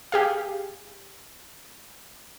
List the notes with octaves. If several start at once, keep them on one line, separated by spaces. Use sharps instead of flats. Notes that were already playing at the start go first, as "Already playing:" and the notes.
G4 G#4 F5